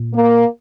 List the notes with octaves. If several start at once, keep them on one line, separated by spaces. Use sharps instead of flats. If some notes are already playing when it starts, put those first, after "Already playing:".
Already playing: A#2
A#3